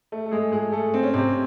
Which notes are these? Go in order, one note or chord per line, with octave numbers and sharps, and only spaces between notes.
A3
A4
G#3 G#4
G#3 G#4
A3 A4
C4
C#4
C3 C4